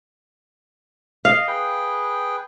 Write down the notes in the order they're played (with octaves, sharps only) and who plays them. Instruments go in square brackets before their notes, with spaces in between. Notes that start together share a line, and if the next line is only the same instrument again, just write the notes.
[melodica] D#5 [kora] F5
[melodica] G#4 B4 G5